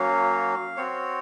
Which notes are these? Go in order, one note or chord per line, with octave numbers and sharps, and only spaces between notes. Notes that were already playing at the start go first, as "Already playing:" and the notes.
Already playing: F#3 A#3 C#4 F#4 F5
C4 F#4 C#5